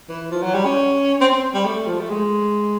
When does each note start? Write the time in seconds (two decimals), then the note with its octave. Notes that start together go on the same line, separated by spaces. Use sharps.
0.09 E3
0.31 F3
0.42 F#3
0.54 G3
0.65 C#4
1.21 C4
1.32 C4
1.54 G3
1.65 A3
1.87 F3
2.01 A3
2.10 G#3